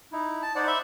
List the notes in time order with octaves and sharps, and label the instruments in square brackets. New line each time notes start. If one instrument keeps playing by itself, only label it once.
[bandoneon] D#4 E4
[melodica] A5
[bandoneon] D#4 C5 F#5 [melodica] D5
[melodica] E5 B5